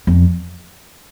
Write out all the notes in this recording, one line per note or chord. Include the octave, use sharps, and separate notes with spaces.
F2